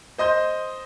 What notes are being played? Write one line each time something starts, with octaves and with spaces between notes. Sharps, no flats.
C5 D#5 C6 G6